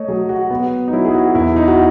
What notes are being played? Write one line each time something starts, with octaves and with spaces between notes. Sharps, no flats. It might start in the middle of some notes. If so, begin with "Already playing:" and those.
Already playing: A3 C#5 D#5
F#3 G#4
F#4
B3
D#4
F#3 E4
G#4
F#4
E2 E4
D#4
F#4